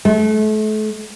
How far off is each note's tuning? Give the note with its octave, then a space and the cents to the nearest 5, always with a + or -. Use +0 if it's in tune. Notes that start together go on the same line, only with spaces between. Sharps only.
A3 -35